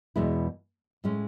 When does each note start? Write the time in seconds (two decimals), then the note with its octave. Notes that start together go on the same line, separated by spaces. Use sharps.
0.16 E2 B2 G#3 B3 E4
1.04 A2 G#3 C#4